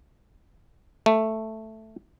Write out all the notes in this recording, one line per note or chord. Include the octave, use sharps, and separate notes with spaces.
A3